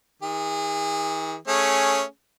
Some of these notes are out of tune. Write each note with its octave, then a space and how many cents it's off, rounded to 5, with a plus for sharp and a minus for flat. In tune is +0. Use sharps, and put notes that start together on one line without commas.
D#3 +45 G#4 -30
A3 +0 C#4 -5 G#4 +0